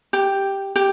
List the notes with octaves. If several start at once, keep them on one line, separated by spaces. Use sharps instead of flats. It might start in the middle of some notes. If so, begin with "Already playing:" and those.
G4
G4